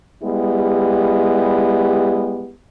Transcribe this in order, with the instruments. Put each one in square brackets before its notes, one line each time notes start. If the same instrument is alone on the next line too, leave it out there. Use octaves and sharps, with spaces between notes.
[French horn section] G3 G#3 B3 E4 G4